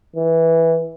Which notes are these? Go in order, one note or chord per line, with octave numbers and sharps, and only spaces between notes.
E3